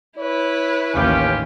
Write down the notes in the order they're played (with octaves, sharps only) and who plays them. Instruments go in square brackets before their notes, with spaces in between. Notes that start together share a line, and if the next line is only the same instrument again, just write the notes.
[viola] E4 B4 [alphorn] C#5
[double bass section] A1 D#2 [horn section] C#4 F4 G4